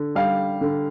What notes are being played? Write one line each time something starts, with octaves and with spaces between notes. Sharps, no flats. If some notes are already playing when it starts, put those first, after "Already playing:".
Already playing: D3
G3 F5
D3